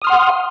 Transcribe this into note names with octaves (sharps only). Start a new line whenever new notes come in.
F#5 C6 D#6 F6